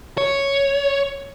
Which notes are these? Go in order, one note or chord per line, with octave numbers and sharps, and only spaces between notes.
C#5